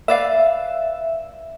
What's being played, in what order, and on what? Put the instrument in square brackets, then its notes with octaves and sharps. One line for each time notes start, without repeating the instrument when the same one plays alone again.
[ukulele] B4 D5 F5 [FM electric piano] E5